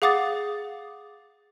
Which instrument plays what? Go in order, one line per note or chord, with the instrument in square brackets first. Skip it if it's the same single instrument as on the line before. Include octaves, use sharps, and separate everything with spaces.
[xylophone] G#4 F5 F#5 D6 D#6 A6